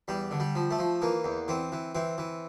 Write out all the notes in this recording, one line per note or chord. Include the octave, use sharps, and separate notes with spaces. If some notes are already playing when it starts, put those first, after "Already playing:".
E2 G3
D3
G3
F3
A3
F3
E3 A#3
E2
E3 C4
E3
E3 C4
E3